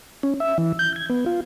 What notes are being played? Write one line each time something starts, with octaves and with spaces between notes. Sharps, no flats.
C#4
E5
E3
G6
G#6
B3
F4